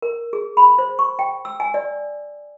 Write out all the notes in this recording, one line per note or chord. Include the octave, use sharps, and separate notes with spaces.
A#4
G#4
B5
C5
C#6
G5
E6
G#5
D5